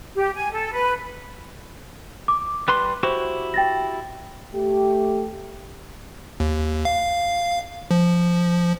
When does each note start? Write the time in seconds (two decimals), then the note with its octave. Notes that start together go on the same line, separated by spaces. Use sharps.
0.16 G4
0.35 G#5
0.52 A4
0.73 B4
2.28 D6
2.68 G3 B4 C6
3.03 E4 F#4 G4 C5
3.54 G5 A6 A#6
4.54 A3 G4
6.40 D#2
6.85 F5
7.91 F3